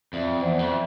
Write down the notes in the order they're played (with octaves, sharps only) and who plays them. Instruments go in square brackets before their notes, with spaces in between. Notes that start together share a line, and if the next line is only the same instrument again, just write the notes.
[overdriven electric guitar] F2 [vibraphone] D5 E5
[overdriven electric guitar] E2 [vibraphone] C5 D5
[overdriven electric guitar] F2
[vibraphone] D5 E5